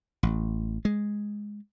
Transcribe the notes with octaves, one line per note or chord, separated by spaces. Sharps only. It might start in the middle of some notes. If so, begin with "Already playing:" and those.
A1
G#3